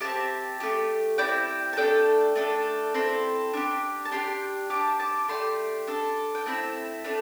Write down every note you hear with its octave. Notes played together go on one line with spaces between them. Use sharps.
C4 G4 E5 A5
A3 E4 G4
C4 E4 G4 D5 G5
A5
A3 D4 A4 D5 G5
A3 D4 A4
C4 E4 A4 G5 C6
D4 G4
A5
D4 G4 G5 C6
D4 G4 A5 D6
A5 D6
A3 D4 G4 G5 C6
D4 A4
G5
A3 C4 E4 E5 A5
A3 D4